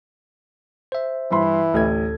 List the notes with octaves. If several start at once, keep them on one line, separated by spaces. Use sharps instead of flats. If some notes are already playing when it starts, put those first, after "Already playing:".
C5 E5
G2 E3 B5 C6
A1 D2 A4 G#6